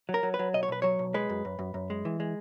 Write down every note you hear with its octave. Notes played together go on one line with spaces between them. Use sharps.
F#3
A#4
F#3
B4
F#3
B1 D#5
C#5
B1 B4
F#3 C#5
B1
G#3 B4
F#2
F#2
F#2
F#2
G#3
E3
G#3